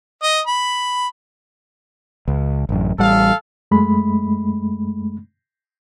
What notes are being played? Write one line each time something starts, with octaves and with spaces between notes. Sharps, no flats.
D#5
B5
C#2
A1 F#2
A1 G3 A4 F5
F#2 G#3 A3 B5